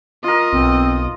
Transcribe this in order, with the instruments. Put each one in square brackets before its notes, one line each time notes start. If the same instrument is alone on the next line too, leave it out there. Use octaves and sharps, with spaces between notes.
[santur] F4 A#4 [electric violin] D#5
[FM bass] B1 [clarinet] C4